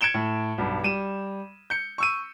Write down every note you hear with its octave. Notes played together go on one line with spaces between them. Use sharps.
G#6 C#7 D7 E7 G7
A2
B1 G2
G3 D#7 E7
G6 C#7
C#6 E6 D#7